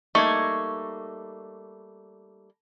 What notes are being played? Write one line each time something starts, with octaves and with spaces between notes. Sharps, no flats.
G3 A3 A#3 D#4 C#6 G#6